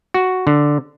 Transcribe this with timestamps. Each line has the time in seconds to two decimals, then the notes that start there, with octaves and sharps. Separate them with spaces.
0.14 F#4
0.47 D3